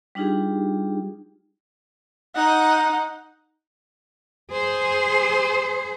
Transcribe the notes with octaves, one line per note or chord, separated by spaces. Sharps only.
G3 D4 D#4 F4 G4 G#4
D#4 F#5
G#4 C5